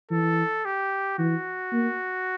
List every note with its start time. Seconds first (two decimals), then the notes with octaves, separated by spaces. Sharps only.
0.11 E3 A4
0.65 G4
1.19 E3 F#4
1.73 A#3